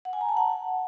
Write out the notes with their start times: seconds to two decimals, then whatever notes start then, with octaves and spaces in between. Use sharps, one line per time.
0.05 F#5
0.13 G#5
0.21 A#5
0.29 A5
0.37 F#5